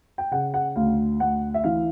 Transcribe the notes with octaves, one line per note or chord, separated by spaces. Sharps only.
G5
C#3 F#5
F#5
D2 F5
D2 F#5
E5
E3 F5